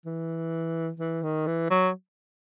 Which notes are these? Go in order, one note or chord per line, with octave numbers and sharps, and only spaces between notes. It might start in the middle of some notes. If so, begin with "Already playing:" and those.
E3
E3
D#3
E3
F#3